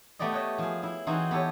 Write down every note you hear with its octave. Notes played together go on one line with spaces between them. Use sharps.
A3 B3 G4 D5 D#5
B4 C#5 D#5 A5
F3 G#4
E4
E3 C4 D#4 F#4 G#4
B3 G4 A4 C#5